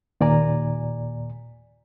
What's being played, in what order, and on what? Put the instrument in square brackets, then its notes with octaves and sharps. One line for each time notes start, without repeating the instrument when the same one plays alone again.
[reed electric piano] D#2 A#2 D5 G#5 A#5